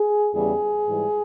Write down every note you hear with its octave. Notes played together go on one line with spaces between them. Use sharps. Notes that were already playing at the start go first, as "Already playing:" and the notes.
Already playing: G#4
E2 C#3 E3 G3 G#4
G#2 E3 G3